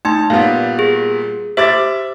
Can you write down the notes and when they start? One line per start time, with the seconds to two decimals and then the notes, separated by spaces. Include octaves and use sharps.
0.05 A3 D#4 A5 C6
0.30 A#2 G3 B3 F5
0.79 G#4
1.57 G4 C5 E5 D6 A6